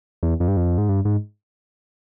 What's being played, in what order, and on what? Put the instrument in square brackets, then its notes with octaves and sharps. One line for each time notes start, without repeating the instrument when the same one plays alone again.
[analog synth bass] E2
F2
G2
F2
G#2
G2
G#2